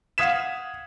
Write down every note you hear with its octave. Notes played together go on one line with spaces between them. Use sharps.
F5 F#5 D#6 G#6 B6 E7